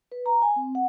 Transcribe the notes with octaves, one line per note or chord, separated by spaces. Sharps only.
B4
A#5
G#5
C4
F#5